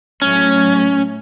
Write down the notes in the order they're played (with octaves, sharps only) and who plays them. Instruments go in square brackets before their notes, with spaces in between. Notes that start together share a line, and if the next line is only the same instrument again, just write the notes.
[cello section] A2 F#3 A3 [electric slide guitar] C#4